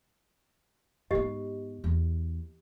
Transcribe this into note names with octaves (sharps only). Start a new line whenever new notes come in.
G#2 B3 G4 D#5
E2